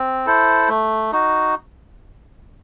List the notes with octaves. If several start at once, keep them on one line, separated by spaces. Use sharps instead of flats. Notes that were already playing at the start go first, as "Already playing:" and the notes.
Already playing: C4
E4 A4 C5
A3
D#4 F#4